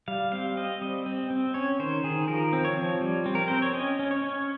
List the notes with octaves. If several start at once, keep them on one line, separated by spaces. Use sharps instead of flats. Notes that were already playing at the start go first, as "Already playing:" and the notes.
G3 F5
C4 F5
C4 D#5
G3 D#5
C4
C4
C#4 C#5
D#3 C5
D#3 G#4
F3 A#4
C4
C#5
F3
G3
C4
A#4
C4 C5
C#5
C#4 D#5
C#4
C#5
C#4